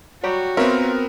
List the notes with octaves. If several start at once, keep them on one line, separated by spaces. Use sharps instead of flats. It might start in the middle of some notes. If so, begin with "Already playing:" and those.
F#3 G3 F#4 G4
B3 C4 F4 A#4 C#5 E5